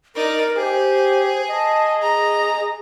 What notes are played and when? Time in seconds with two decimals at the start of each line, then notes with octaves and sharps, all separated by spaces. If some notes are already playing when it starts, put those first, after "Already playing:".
0.15 D#4 A#4 D5
0.57 G4 G#4 C5
1.50 D#5 A5
2.02 G#4 A#5